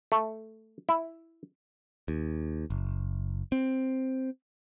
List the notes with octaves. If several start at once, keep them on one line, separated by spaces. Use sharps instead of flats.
A3
E4
D#2
F#1
C4